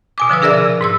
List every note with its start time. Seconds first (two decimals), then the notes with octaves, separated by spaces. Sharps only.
0.18 B2 G#5 D6
0.29 D3 F3 B4 E6
0.42 D4 G#4 A#4 D5 E5
0.57 C3
0.81 G#2 C6 E6